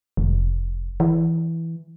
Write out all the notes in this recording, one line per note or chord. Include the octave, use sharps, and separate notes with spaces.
F1
E3